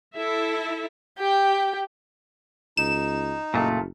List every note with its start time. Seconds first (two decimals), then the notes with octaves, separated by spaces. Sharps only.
0.16 E4 A4 E5
1.19 G4 G5
2.77 C#2 D#4 E7
3.54 F#1 A#2 A3